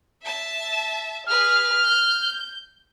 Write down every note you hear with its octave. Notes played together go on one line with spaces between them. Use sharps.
E5 A5
G#4 B4 F6
G6